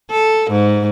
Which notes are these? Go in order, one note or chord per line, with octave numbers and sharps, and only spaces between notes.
A4
G#2